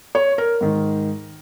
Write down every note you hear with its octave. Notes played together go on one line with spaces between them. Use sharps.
C#5
A#4
G#2 D#3